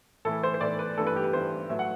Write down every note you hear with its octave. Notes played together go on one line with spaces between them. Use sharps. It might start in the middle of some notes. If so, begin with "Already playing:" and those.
A2 E3 A3 A4
C5
C5
A2 E3 A3 D5
B4
G2 E3 A3 A4
B4
G4
B4
G2 E3 A3 C5
A2 F#3 A3 E5
F#5